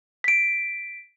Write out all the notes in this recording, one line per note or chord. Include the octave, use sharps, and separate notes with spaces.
B6 D7